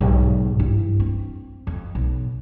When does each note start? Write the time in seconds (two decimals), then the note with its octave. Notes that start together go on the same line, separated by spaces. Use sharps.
0.01 B1 G#2
0.59 G2 E4
1.00 C4
1.67 F2
1.95 B1